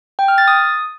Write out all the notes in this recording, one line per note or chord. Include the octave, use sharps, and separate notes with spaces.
G5
F6
A6
D#6